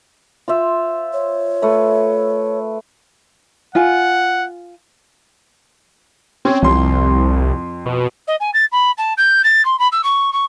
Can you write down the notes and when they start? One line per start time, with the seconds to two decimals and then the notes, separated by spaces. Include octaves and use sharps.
0.48 F4 C5 E5
1.13 C#5
1.62 A3 B4
3.75 F4 F#5 G#5
6.45 C4 C#4
6.62 C2 F2 C6
7.86 B2
8.27 D#5
8.40 G#5
8.53 A6
8.72 B5
8.97 A5
9.17 G6
9.44 A6
9.65 C6
9.79 B5
9.92 E6
10.03 C#6
10.33 C#6